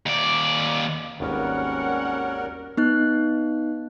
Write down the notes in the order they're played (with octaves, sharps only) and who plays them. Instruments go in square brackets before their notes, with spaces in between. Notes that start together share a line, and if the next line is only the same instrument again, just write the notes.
[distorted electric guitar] D#2 D5
[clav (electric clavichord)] G#1 D#2 B3 [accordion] G3 A#4 [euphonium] C#4 [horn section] C#5 F#5
[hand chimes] B3 D#4 F#6